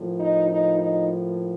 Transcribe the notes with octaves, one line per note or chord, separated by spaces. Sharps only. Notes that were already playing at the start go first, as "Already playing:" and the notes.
Already playing: A2 F3 A#3
D#4
D#4
D#4